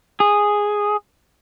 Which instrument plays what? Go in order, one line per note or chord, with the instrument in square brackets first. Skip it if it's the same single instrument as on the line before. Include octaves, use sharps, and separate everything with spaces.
[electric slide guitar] G#4